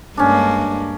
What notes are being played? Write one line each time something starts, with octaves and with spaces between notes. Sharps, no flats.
G2 G#3 A#3 C#4 D4